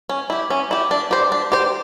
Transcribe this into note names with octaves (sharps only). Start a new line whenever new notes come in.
C#4
E4 G4
C#4
E4 G4
D4
G4 C5
D4
G4 C5